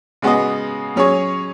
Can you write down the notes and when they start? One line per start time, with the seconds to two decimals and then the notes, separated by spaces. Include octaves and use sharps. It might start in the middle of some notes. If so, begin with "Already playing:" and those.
0.22 C#3 G#3 B3 F#4 D#5
0.96 F#3 C#4 G#4 C#5